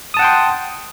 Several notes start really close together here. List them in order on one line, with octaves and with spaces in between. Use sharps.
D#6 A5 F#5 G5 C6